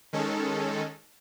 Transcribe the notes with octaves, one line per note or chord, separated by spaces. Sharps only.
D#3 G#3 C#4 A4